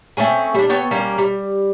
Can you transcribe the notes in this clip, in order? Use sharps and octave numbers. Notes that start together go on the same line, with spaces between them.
A3 C4 C#4 G#4
G3 D4
B3 A4 C#5 G5
G3 A#3 C#4
G3